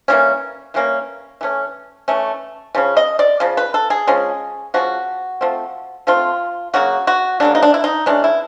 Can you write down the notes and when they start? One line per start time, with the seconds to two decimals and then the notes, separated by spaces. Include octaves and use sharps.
0.08 E3 G3 A#3 C#4
0.74 E3 G3 A#3 C#4
1.41 E3 A3 C#4
2.08 E3 A3 C#4
2.75 C#3 F3 C#4
2.97 D#5
3.19 D5
3.40 C#3 F3
3.57 B4
3.74 A4
3.90 G#4
4.07 F3 G#3 C#4
4.74 F3 G#3 C#4 F#4
5.41 F3 A3 C4
6.07 F3 A3 C4 F4
6.74 C#3 F#3 A#3 F#4
7.07 F#4
7.40 C#3 F#3 A#3 D4
7.55 D#4
7.63 D4
7.74 E4
7.84 D#4
8.06 E3 G#3 C#4 D4
8.24 E4